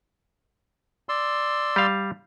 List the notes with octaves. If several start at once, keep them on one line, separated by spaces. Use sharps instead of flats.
D5 C6 E6
G3 F5